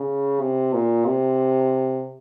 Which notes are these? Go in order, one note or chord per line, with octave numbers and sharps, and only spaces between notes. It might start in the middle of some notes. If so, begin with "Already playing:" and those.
Already playing: C#3
C3
A#2
C3